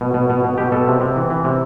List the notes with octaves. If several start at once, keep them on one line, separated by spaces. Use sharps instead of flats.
B2
B2
B2
B2
B2 G4
B2 A4
C3
C3
E3
E3
C3